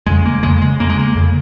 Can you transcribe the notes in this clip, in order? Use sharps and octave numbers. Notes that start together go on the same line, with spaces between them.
F2 C#3 G#3
A#3
F2 C#3 G#3
G#3
F2 C#3 A#3
G#3
A#3
F2 C#3